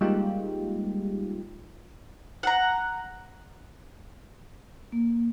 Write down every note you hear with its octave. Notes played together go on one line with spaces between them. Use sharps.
G3 G#3 A#3 D#4 F4 G4
F#5 A#5
A#3